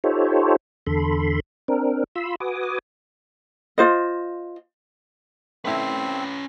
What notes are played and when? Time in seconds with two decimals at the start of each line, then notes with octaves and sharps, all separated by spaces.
0.04 D#4 F4 G4 A4 C5 C#5
0.87 E2 D3 A4 B5 C6
1.68 C4 D4 A#4
2.16 F4 B5 C6 E6
2.40 F#4 B4 G#5 D6 D#6
3.78 F4 C5 D#5
5.65 A3 C4 C#4 E4 B4